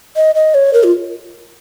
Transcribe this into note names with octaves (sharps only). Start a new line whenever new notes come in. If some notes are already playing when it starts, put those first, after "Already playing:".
D#5
D#5
C#5
A#4
F4